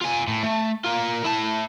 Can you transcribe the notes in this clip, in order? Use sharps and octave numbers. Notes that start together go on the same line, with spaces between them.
F4 G#5
A2
A3
F4 A#4
E4 A5